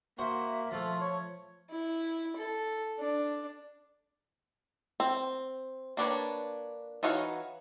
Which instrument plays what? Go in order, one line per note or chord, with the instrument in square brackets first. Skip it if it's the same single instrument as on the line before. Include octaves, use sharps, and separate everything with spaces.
[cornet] A#3 [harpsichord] F#4 C5 [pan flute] E5
[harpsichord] F3 A3 [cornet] F4
[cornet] C#5
[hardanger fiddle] E4
A4
D4
[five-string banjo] C4
A#3 D4 B4 C#5
E3 D#4 F#4 C#5 F5